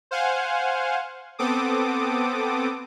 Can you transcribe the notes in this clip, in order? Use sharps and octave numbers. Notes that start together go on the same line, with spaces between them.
C5 F5 F#5 G#5
B3 C4 A4 D6 D#6